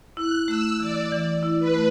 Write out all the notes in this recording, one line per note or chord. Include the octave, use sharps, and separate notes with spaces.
E4 F#6
A3 E6
E3 D5
E3
E4
B4
A3